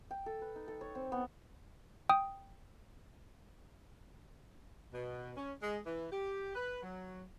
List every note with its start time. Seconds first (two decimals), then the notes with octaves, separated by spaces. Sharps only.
0.11 G5
0.26 A4
0.42 B4
0.56 D#4
0.68 A4
0.81 C#5
0.95 C4
1.12 B3
2.09 G5 D#6
4.93 B2
5.36 C#4
5.62 G#3
5.86 E3
6.11 G4
6.55 B4
6.82 F#3